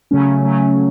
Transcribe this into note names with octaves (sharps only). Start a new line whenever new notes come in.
C#3 F#3 A3 C#4
C#3 F#3 A3 C#4